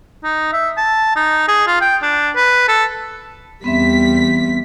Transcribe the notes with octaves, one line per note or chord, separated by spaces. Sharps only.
D#4
E5
A5
D#4
G#4
F4
G5
D4
B4
A4
E2 G3 B3 C4 E5 B6